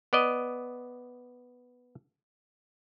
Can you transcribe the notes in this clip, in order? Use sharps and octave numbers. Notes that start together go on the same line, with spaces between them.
B3 D5 D#5